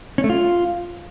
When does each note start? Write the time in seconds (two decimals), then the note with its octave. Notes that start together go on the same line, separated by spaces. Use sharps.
0.18 C#4
0.24 A3
0.30 F4